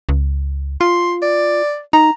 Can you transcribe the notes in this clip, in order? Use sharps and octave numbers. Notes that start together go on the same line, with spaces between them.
C#2
F4 C6
D5
D#4 A#5